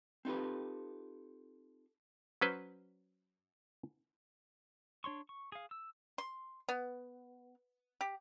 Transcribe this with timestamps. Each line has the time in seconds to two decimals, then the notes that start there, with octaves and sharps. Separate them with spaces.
0.25 C4 D#4 F4 G4 A4 B4
2.41 F#3 C#4 B4 C5
5.04 D4 C#5 C6 C#6
5.29 C#6
5.52 G#4 F5
5.71 E6
6.18 C6
6.68 B3
8.01 G4